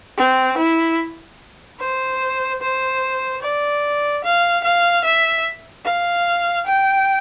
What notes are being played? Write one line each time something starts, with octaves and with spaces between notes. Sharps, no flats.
C4
E4
C5
C5
D5
F5
F5
E5
F5
G5